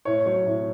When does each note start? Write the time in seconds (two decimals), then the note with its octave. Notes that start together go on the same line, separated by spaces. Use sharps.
0.05 A2 C#5
0.26 F#3 C#5
0.46 A2